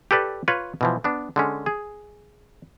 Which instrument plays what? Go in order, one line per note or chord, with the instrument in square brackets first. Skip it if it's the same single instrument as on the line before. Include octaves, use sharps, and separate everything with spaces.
[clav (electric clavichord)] G4 A4 B4 D5
F4 B4 C#5
B2 E3 F3
B3 D4
D3 G#3 C#4
G#4